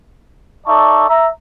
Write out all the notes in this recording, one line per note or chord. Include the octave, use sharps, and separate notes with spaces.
D#4 A4 D5 E5 A5 C#6
E5 A#5